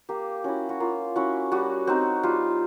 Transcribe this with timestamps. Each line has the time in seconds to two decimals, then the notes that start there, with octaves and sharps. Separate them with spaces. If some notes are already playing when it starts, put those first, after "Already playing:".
0.09 A#3 G4
0.44 C#4 E4 F#4
0.69 F#4
0.80 A#3 F4
1.16 C#4 E4 F#4
1.52 G3 F#4
1.87 C4 D#4 F#4
2.23 G3 F4